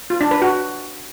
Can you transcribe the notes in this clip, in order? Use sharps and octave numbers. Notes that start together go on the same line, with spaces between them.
F4
D4
B4
F#4